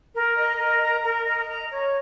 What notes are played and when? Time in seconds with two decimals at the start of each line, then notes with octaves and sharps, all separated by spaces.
0.14 A#4
0.36 D#5
0.59 A#4
0.81 A#5
1.03 A#4
1.26 D#5
1.48 A#5
1.71 C#5